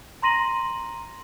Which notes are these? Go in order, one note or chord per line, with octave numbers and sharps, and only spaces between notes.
A#5 C6 A#6 D#7 F#7